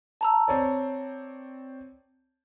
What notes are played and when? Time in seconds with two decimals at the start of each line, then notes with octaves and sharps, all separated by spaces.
0.21 A5 A#5 E6
0.48 C4 C#5 D5